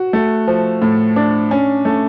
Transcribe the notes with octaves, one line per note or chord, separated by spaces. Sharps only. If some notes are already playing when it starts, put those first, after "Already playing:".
Already playing: F#4
A3
F3
A2
D4
C#4
A3